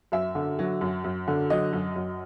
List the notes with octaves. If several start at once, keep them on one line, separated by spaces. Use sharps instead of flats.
F#2 E5
D3
F#3
F#2
F#2
D3
F#3 D#5
F#2
F#2